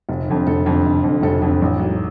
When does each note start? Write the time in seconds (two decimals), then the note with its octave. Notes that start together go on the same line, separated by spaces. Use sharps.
0.09 F1
0.28 F2 D3
0.47 F1 A4
0.66 F2 D3
0.85 F1
1.04 F2 D3
1.23 F1 A4
1.42 F2 D3
1.62 A1
1.80 G#2 F#3